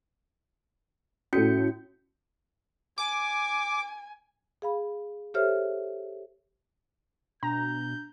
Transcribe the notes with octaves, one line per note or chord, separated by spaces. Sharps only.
A2 C#4 F#4 A4 G6 C#7
G#5 D6
G#4 F5 B5
G4 A4 C5 C#5 E5 F6
B2 D4 A#5 G6